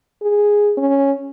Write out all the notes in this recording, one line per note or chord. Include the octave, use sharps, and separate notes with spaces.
G#4
C#4